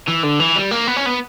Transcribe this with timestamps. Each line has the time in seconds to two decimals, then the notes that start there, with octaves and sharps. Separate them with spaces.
0.08 E3
0.24 D3
0.40 E3
0.56 G3
0.71 A#3
0.87 B3
0.96 C#4
1.06 B3